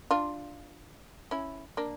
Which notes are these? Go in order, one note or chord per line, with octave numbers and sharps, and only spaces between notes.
D4 F4
C#4 E4
A#3 D4